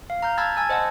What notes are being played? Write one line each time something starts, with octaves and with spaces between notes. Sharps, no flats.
F5
A#5 F6 G6
A5 B5 E6 F6 G#6 A6
G#5 A5 E6 G#6
C5 D#5 F#5 A5